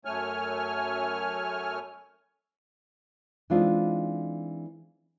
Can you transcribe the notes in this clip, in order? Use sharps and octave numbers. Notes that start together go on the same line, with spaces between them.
F#2 A3 C#5 G#5 F6
E3 G#3 C4 D4 D#4 F4